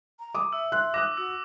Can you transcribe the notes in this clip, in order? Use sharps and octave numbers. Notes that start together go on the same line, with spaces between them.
A#5
D6 D#6
E5 E6
C6 F#6
D6 D#6 F#6 A#6
F#4 E6